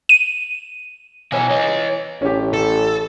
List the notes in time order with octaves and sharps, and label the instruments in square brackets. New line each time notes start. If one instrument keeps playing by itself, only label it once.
[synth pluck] D#7
[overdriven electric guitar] B2 C#5 [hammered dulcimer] E3 A#5
[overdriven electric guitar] C#5 D#5
[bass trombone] A1 [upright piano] C#4 G4
[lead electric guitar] A4